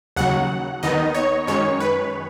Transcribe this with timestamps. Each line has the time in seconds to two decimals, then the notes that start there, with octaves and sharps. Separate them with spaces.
0.16 D#2 C#3 F#3 F#5
0.83 D#2 D#3 B3 D#4 D#5
1.14 C#5
1.47 F#2 D#3 G#3 C#4 C#5
1.80 B4